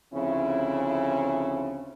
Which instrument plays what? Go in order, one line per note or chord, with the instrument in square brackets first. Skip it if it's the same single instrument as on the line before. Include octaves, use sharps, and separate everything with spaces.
[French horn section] D2 C#3 F3 C4 C#4 E4